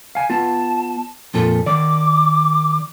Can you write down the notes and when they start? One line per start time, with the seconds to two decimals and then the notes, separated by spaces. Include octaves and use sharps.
0.15 F5 G#5
0.30 B3 F4 A5
1.34 F2 A#2 F4 A4
1.66 D#3 D5 D6